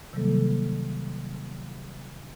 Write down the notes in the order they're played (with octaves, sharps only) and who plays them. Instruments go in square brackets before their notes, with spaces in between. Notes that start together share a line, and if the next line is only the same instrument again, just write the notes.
[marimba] C3 D#3 F#3 G3 A#3 A4